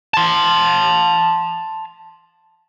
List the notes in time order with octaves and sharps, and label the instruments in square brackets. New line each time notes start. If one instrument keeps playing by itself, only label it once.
[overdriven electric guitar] A5 C6